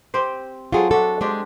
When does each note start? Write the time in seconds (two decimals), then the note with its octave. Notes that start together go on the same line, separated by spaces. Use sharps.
0.14 C4 G4 C5
0.72 F#3 C4 F4 G#4 A4
0.91 D4 F#4 A4 E5
1.21 G#3 C4 D4 G4